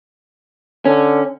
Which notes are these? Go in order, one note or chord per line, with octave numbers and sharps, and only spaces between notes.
D3 C#4